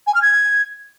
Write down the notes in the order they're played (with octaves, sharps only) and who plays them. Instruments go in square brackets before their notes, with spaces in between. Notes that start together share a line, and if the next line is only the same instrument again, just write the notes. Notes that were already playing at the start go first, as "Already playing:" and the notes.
[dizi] G#5
F6
G#6